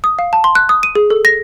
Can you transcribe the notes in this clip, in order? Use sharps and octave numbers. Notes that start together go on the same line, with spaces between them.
D#6
F5
A5
C6
F#6
D#6
D#7
G#4
A4
A#6